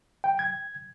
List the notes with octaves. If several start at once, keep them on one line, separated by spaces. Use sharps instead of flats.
G5
G#6